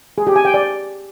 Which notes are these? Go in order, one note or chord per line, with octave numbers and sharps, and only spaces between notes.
G#4
G4
G#5
G5
D5